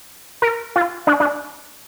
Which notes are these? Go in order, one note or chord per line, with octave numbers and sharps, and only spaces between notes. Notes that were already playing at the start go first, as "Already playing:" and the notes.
A#4
F4
D4
D4